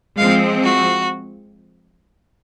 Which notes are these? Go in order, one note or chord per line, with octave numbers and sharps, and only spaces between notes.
F3 G#3 C4 F5
F#4